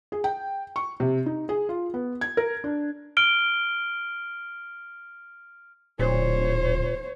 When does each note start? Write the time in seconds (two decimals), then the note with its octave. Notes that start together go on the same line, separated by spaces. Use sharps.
0.12 G#4
0.24 G5
0.76 C#6
1.00 C3
1.26 D#4
1.49 G#4
1.69 F4
1.94 B3
2.21 G#6
2.37 A#4
2.64 D4
3.17 F6 D7 G7
5.99 D1 A#2 C5 C#5